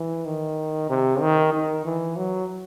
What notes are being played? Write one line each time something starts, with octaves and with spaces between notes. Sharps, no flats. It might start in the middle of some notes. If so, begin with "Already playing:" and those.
Already playing: E3
D#3
C3
D#3
D#3
E3
F#3